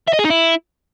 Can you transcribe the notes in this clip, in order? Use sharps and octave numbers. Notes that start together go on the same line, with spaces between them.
E5
D#5
G#4
D#4
E4